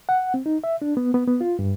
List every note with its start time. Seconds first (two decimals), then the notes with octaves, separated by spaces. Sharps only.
0.09 F#5
0.34 C4
0.46 D#4
0.64 E5
0.82 D4
0.97 B3
1.14 B3
1.28 B3
1.41 F4
1.59 G2